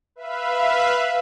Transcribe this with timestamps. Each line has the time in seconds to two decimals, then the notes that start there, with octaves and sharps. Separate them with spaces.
0.16 B4 E5 F5 B5